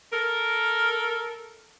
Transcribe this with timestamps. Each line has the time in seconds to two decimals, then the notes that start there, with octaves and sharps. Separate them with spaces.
0.12 A4 A#4